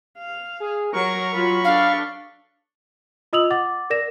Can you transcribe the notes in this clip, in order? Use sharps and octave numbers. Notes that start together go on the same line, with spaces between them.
F5
G#4
F#3 A#4 C#6
F#3 F4 B5
D4 A4 F5
F4 D#5 D#6 E6 F7 F#7
F#5 D6 A6
A#4 D5 A#6 E7